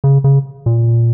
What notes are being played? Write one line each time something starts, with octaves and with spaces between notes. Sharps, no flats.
C#3
C#3
A#2